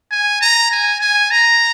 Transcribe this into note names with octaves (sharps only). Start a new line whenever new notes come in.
G#5
A#5
G#5
G#5
A#5